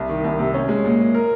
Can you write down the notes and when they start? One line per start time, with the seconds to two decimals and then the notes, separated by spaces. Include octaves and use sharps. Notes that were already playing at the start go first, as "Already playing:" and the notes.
Already playing: C2
0.09 D#3
0.24 C2
0.39 C3
0.54 C#4
0.69 G#3
0.84 A#2
0.99 A#2
1.14 A#4